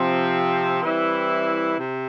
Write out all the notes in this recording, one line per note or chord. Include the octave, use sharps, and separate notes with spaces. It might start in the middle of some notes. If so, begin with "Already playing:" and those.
Already playing: C3 F3 C4
E3 G3 C4 E4
C3